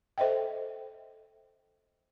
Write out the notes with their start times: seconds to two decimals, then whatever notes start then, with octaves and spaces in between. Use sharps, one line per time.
0.18 A4 C5 D#5 E5 G5